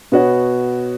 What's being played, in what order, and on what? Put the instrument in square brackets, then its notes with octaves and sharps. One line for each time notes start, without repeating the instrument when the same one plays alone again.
[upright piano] B2 B3 F#4 C#5